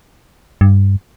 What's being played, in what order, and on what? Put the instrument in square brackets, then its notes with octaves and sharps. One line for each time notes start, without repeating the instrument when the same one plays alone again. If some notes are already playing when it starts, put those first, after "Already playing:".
[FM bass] G2